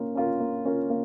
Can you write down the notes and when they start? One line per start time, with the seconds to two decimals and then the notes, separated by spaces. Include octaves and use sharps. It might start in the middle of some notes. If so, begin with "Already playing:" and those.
Already playing: A#3 C#4 F4 A#4
0.15 C#4 F4 A#4
0.40 A#3
0.65 C#4 F4 A#4
0.90 A#3